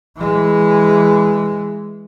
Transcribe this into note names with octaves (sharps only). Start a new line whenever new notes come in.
E3 G#3